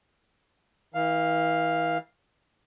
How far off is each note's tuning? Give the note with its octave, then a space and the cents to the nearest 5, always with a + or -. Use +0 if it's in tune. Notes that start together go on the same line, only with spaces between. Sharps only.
E3 -40 F5 +0